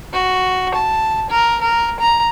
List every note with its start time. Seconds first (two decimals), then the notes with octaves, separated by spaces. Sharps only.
0.13 F#4
0.74 A5
1.30 A#4
1.61 A#4
2.00 A#5